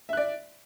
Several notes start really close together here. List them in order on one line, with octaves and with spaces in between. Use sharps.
E5 F#6 D5